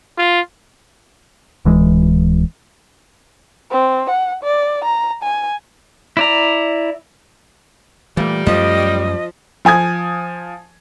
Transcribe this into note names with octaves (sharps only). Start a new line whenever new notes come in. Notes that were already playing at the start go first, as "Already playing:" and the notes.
F4
D1 E3 G#3
C4
F#5
D5
A#5
G#5
E4 D5 A#5
A#2 E3 G3 A3
F#2 F3 A3 D#5
F3 G#5 D#6 G#6